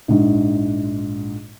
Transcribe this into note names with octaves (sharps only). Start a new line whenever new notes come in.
A#1 G#2